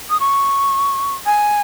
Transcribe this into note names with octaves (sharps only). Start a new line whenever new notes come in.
D#6
C#6
G#5